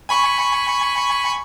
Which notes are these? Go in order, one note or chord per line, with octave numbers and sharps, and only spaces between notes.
G#5 B5 C#6